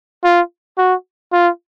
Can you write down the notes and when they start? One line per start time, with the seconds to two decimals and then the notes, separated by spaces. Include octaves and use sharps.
0.24 F4
0.78 F#4
1.32 F4